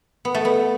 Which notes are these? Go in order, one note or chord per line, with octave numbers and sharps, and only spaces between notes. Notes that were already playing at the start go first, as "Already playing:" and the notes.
B3
A3
B3